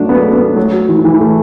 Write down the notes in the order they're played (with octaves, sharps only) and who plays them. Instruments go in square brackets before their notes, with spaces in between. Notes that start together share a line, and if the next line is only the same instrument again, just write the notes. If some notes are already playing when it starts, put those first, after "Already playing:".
Already playing: [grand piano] F#3 A3 F#4 [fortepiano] D4
[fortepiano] B3 [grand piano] A4
[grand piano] A3
[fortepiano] B3
[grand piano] F#4
[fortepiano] F#3 [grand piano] A3
[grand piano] F#4
E3
E3
A3